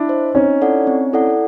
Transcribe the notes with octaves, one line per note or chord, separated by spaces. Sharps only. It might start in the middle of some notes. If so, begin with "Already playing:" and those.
Already playing: D4 E4
C5 D#5
C4 C#4 D#4
E4 A4 D5 F#5
C4
E4 A4 D5 F#5